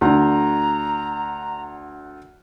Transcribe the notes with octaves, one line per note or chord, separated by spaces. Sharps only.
D2 D3 A#5